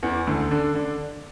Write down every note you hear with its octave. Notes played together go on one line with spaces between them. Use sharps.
E2 E3
D2 D3
D3 D4
D3 D4